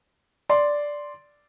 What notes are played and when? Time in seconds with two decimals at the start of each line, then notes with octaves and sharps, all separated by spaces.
0.49 D5 C6